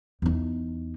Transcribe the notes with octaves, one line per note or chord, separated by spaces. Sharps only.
E2 D#4